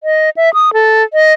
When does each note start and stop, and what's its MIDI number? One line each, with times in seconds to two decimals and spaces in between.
0.04 0.30 75
0.37 0.53 76
0.54 0.73 87
0.74 1.03 69
1.13 1.33 75